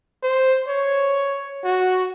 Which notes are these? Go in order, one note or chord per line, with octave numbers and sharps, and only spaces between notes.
C5
C#5
F#4